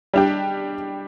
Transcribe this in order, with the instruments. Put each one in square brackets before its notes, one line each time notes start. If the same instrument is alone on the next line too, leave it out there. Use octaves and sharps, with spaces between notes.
[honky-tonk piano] G3 D4 G4